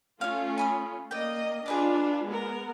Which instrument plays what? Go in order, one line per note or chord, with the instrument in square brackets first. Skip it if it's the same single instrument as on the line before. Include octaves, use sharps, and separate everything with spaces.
[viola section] A3 C#4 F4 [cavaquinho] C#5 F5
[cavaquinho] G#5 B5 D#6
[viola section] A#3 D#5 [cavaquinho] D5 G5
[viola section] D4 F4 [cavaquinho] G#4 B4 D5
[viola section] G#3 B3 A#4